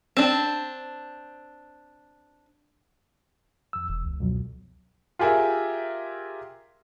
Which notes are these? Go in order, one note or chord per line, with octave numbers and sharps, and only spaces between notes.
C4 D4
F2 E6
E1 E2
C#2
F2 B2 F#3
F4 G4 G#4 A#4 E5